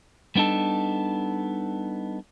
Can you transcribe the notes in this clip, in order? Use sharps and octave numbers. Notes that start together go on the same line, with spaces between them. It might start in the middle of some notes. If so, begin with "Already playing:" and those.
G3 B3 D4 D#4 A4